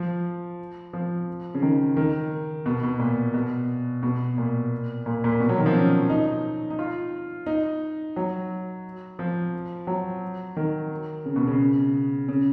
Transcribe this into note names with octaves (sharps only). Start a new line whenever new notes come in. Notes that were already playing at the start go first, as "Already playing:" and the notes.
Already playing: F3
F3
C#3
D#3
D#3
B2
B2
A#2
B2
B2
A#2
A#2
A#2
B2
F#3
D#3
F3
C#4
D#4
D#4
F4
D#4
F#3
F3
F#3
D#3
C#3
B2
C#3
C#3